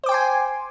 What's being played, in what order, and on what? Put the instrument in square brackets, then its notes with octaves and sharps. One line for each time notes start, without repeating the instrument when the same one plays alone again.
[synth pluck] C5
D6
G5
C6
G#5